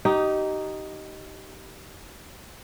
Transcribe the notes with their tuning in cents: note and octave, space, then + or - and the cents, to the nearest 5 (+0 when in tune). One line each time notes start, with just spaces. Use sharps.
D#4 +0 G4 -25